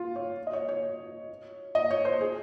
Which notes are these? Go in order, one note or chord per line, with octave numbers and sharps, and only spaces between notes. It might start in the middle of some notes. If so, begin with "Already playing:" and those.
Already playing: F4
C#5
D#5
C#5
C#5
D#5
C#5
C5
G#4